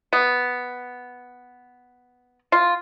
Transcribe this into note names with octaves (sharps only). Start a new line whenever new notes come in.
B3
F4